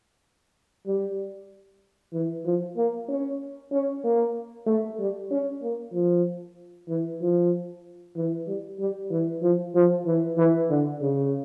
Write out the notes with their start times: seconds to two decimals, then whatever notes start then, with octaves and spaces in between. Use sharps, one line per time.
0.87 G3
2.13 E3
2.45 F3
2.77 A#3
3.09 C#4
3.72 C#4
4.04 A#3
4.67 A3
4.99 G3
5.31 C#4
5.63 A#3
5.93 F3
6.89 E3
7.21 F3
8.17 E3
8.47 G3
8.80 G3
9.11 E3
9.42 F3
9.75 F3
10.06 E3
10.38 E3
10.70 D3
11.01 C#3